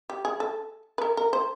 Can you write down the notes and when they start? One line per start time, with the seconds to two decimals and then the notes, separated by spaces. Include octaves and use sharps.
0.10 G4
0.25 G#4
0.40 A4
0.98 B4
1.02 A#4
1.17 A#4
1.33 C5